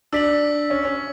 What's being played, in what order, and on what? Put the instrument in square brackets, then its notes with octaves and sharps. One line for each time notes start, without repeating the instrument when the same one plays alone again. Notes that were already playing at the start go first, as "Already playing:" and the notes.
[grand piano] D4 [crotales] E6 B6 F#7
[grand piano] C#4
C#4